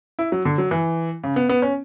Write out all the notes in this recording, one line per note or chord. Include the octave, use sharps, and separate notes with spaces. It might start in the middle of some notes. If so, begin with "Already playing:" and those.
E4
F#3
D3
F#3
E3
C#3
B3
B3
C#4